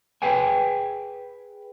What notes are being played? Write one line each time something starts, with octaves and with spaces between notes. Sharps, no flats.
G#4 B4 G5 G#5